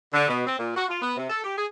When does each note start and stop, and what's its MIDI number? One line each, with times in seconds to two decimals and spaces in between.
0.14 0.27 50
0.28 0.44 47
0.46 0.58 60
0.58 0.75 46
0.76 0.84 66
0.88 0.97 65
1.01 1.16 59
1.17 1.29 48
1.30 1.43 69
1.44 1.55 67
1.56 1.65 68